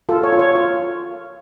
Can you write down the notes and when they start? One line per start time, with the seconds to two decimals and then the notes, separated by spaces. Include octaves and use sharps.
0.09 F4 A4
0.23 C#5
0.32 F4
0.39 C#5
0.55 F4